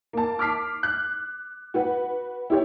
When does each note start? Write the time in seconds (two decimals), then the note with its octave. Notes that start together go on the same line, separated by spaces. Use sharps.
0.13 A#3 A5
0.39 D6 F6 B6 C7
0.83 F#6
1.74 F#4 B4 F#5
2.50 E4 G4 C#5